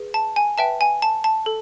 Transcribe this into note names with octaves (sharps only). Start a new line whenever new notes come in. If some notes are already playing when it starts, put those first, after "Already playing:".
Already playing: G#4 B4
A5
G#5
B4 E5 G5 A5
G#5
A5
A5
A4